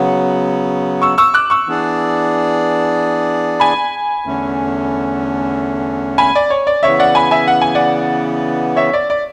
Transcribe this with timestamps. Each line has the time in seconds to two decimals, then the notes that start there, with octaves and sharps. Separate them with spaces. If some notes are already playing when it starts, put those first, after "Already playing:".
Already playing: C#3 F#3 B3
1.02 C#6 E6
1.18 C#6 E6
1.34 D6 F#6
1.50 C#6 E6
1.67 E3 B3 D4 G#4 D5
3.60 G#5 B5
4.25 E2 D3 A3 C#4
6.18 G#5 B5
6.35 D5
6.50 C#5
6.67 D5
6.83 C#3 E3 B3 C#5 E5
6.99 D5 F#5
7.15 G#5 B5
7.31 E5 G#5
7.48 F#5
7.62 G#5
7.75 D5 F#5
8.76 C#5 E5
8.93 D5
9.10 D5